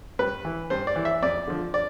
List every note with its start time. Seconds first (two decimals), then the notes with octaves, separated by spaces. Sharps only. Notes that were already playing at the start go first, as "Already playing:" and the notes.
0.19 G2 B4
0.45 E3
0.70 G2 C5
0.87 D5
0.96 E3
1.05 E5
1.22 F2 D5
1.47 D3 F3
1.74 D5